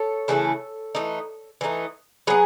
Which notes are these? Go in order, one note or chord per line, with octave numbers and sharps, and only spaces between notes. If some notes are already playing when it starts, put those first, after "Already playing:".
Already playing: A4 C#5
C#3 E3 A3 E4
E3 A3 D#4
E3 A3 D#4
F#3 B3 G#4 B4